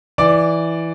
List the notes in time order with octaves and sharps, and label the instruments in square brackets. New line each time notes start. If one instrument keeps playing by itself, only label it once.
[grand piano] E3 D5 D6